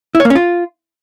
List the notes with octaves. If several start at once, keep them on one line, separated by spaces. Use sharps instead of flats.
E4
C#5
A#3
C#4
F4